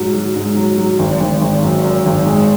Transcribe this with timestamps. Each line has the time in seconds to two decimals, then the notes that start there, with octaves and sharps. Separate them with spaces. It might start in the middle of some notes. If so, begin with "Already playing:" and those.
Already playing: G#2 F#3
0.14 F#3
0.36 G#2
0.57 F#3
0.78 F#3
0.99 G#1
1.20 G#1
1.42 G#1
1.63 F#2
1.84 F#2
2.05 G#1
2.26 G#3